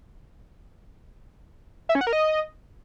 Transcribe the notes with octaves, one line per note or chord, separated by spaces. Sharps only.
E5
C#4
F#5
A#4
D#5